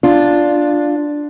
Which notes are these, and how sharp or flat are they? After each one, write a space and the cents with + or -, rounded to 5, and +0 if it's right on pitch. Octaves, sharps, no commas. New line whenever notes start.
D4 +0 F4 +0